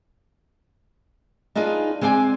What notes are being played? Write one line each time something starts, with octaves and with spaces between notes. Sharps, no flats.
D4 D#4 F4 G#4 B4
G#3 C4 C5 D5 E5 G#5